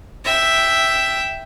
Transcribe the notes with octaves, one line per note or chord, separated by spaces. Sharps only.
E5 G5